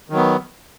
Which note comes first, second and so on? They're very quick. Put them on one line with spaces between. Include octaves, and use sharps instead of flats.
D#3 F#3 B3